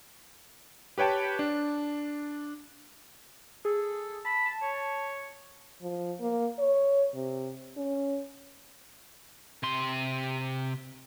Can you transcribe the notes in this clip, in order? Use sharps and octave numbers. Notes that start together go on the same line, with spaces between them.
G4 B4 C#5 G5 A5
D4
G#4 A4
A5 B5
A5
C#5
F3
A#3
C#5
C3
C#4
C3 C6